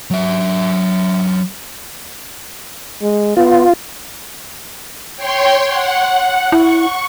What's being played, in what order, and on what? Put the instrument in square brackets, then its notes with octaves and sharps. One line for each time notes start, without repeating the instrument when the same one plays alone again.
[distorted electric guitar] F#3 E5
[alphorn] G#3
[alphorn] B3 [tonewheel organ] F4
[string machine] C#5 G5 C6
F#5
[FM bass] E4 [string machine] C#6